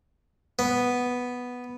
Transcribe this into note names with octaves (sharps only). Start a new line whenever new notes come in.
B3